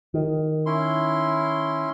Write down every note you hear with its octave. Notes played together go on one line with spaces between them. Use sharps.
D#3
C#4 E4 C6